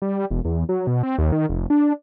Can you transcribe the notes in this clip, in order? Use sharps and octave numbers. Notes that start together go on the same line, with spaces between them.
G3
E1
E2
F#3
B2
C4
D#2
D#3
F1
D4